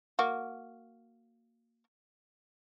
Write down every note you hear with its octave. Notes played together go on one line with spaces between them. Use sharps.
A#3 F#4